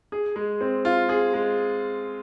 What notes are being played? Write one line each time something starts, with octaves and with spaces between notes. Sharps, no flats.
G#4
G#3
C4
F4
G#4
G#3